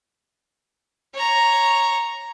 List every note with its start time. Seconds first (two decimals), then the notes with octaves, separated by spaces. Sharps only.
1.14 C#5 A#5